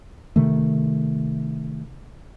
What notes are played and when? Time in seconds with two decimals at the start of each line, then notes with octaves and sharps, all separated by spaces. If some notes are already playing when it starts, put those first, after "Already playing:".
0.36 C3 D#3 A3